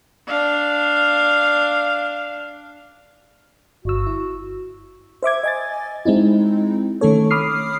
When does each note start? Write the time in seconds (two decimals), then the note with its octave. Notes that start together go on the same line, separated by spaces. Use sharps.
0.27 D4 F5
3.85 G1 F#4 E6
4.07 E4
5.23 C5 E5 D6 G#6
5.43 D#5 G#5 A6
6.05 G#3 C4 D#4 E4
7.01 D#3 A3 C#4 A4 C#5
7.31 B5 D6 D#6 F6 C7